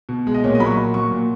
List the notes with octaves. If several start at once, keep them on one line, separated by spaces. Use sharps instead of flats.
B2
G#3
D#5
A#2 C#5
D#5
F#3 B5
C#6
A#2
F#3 C#6
A#2